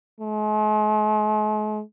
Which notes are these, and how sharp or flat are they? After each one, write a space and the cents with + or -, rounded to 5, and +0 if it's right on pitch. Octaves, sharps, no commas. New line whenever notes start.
G#3 +45